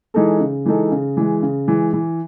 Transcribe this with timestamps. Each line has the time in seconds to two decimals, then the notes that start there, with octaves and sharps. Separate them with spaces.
0.14 E3 G#3 D#4 A4
0.40 C#3
0.65 E3 G#3 D#4 A4
0.91 C#3
1.17 E3 G#3
1.42 C#3
1.68 E3 G#3
1.93 E3